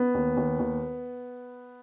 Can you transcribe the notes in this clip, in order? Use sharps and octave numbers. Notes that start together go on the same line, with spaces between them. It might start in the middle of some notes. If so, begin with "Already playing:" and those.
Already playing: B3
D#2
D#2
D#2